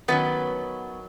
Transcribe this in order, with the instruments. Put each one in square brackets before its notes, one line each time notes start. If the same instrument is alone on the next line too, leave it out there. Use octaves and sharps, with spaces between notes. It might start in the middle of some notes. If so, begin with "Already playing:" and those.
[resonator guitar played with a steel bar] D#3 F#3 B3 C#4 B4